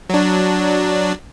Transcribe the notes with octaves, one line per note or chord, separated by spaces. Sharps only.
F#3 D4